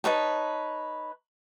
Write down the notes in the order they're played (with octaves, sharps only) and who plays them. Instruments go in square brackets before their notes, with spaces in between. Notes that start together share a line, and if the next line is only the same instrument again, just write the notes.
[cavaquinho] D#4 B4 C#5 A5